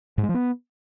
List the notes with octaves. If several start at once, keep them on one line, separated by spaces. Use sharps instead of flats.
G#2
G#3
F3
B3